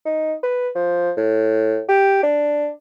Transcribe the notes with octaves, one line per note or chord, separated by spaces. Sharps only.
D#4
B4
F3
A2
G4
D4